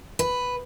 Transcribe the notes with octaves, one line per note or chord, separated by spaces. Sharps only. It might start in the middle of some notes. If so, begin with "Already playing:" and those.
B4